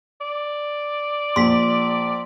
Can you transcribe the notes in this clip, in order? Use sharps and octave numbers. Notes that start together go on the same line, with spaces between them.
D5
A#1 C6 B6